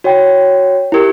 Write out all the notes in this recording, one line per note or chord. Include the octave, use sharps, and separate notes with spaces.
F#4 C#5 G5
E4 G4 A#4